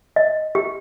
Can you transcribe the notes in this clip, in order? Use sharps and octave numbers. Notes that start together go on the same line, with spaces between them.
D#5
G4